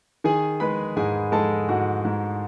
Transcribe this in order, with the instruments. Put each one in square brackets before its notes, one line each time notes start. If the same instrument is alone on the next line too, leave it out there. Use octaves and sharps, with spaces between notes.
[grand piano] D#3 G#4 G#5
G#3 B4 B5
G#2 G#4 G#5
G#3 A4 A5
G#2 F#4 F#5
G#2